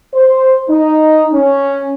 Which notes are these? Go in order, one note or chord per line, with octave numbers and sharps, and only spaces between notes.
C5
D#4
C#4